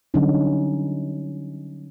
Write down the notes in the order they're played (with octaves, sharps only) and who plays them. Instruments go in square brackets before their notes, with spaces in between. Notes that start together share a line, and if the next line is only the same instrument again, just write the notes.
[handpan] D3 F#3 G3 C#4 D#4